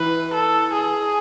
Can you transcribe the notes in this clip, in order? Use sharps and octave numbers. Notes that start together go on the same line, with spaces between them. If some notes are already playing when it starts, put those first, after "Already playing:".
Already playing: E3 B4
A4
G#4